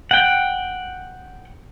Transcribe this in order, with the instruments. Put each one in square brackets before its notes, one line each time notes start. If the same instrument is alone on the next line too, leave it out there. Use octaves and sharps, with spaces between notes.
[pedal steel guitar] F#5 G5